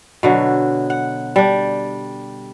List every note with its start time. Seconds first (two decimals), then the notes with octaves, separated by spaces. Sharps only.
0.23 B2 D3 F#3
0.90 F#5
1.36 G3 D4